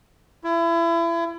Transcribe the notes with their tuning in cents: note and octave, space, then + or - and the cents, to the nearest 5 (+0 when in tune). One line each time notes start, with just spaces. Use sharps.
E4 +30